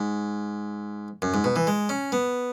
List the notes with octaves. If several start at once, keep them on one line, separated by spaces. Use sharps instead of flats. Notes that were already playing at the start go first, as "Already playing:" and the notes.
Already playing: G#2
F#2
G#2
B2
E3
G#3
C#4
B3